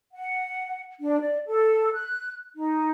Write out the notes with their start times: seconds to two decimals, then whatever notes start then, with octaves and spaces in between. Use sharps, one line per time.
0.13 F#5
1.00 D4
1.20 D5
1.46 A4
1.94 F#6
2.55 D#4